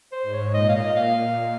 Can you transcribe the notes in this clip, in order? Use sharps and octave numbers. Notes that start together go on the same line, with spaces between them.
C5
G#2
C#5
A#2 D#5
F5
D#5
F5
A#2